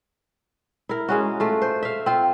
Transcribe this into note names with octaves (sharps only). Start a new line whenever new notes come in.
E4 A#4
G#3 C#4 F#4
A3 F4
C5
E5 F5
C4 F4